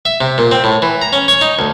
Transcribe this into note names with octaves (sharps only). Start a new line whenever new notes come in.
E5
C3
A#2
C4
A2
E3
A#5
C#4
C#5
D#4
D2